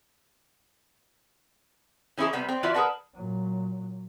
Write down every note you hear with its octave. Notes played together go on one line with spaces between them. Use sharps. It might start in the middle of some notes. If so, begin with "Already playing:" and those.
E3 C#4 D#4 E4 G#4
C3 G3 B3
C4
E3 F4 F#4 D5 E5
G#4 A#4 B4 F#5 A5
A#2 F#3